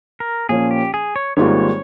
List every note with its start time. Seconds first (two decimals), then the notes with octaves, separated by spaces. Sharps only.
0.20 A#4
0.49 A#2 F3 A#3 C#4 G#4
0.71 G4
0.94 G#4
1.16 C#5
1.37 G#1 G#2 G3 A#3 F4 C#5